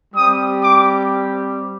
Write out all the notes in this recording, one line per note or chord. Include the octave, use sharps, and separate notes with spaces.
G3 C4 G4 D#6
D6